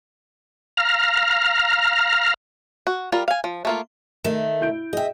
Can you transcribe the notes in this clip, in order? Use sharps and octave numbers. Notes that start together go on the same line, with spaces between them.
F5 A#5 F6
F#4
G3 F4 A#4
F5 G#5
F3
A3 A#3 F4
D#3 A3 A#4 D#5 E7
E4 G6 D7
G#4 D#5 E5 G5